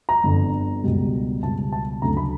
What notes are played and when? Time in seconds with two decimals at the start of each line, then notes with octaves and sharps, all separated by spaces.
0.09 A#5
0.23 G1 F2 D3
0.84 C#2 B2 G3
1.42 C#2 B2 G3 A5
1.72 A5
2.02 D2 C#3 F#3 A3 A#5
2.17 B5